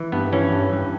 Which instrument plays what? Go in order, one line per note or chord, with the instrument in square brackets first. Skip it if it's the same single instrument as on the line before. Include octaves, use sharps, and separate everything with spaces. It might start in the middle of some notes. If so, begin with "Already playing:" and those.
Already playing: [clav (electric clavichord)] E3
G2 B3
E3 C#4
G2
G2